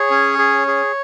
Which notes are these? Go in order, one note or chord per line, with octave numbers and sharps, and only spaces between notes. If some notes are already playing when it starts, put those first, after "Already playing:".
Already playing: G#4 C#5
C#4
G#4
G#4